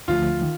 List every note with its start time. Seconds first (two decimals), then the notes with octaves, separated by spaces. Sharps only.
0.08 D2 D3 F3 A3 F4
0.42 D#3